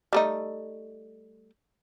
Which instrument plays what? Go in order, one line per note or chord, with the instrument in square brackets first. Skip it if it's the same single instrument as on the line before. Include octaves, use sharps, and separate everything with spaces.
[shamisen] G3 A3 D#4